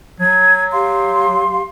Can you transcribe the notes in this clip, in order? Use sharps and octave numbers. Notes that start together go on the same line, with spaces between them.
F#3 G#6
G4 F5 C6